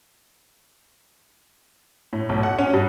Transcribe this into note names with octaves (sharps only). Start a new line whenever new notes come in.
A2
B1
F#5
C#4
G2